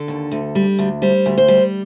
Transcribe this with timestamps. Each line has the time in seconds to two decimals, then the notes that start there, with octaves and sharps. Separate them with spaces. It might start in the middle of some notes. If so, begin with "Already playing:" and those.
Already playing: D3 A4
0.08 D#2
0.31 D2
0.55 G3
0.79 D2
1.02 G3 C5
1.26 D2
1.38 C5
1.48 G3